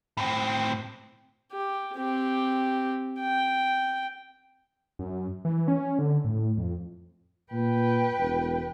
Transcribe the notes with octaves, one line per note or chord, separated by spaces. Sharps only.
A2 C4
G4
C4 G4
G5
F#2
E3
C#4
D3
A2
F2
A#2 B4 G5
E1